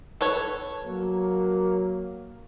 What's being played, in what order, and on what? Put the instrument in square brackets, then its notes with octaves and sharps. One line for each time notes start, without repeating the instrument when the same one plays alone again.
[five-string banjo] A4 B4 C#5
[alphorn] F#3 [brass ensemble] A#3